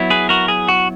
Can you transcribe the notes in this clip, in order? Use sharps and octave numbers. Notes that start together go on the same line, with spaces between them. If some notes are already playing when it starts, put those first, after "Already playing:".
Already playing: F#3 B3 E4
G#4 B4
F#4 A#4
G#4
F#4